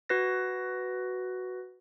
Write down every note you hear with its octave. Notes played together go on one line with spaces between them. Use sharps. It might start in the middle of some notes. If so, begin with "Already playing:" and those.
F#4 B4 A#6